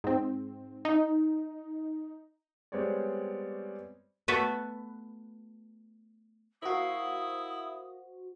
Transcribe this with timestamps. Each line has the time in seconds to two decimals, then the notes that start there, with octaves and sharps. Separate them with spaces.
0.04 G#2 C4
0.85 D#4
2.72 G3 G#3 B3 C4 C#5 D5
4.28 A3 B3 F#4 B4
6.63 E4 F#4 A#4 C5 F5 D#6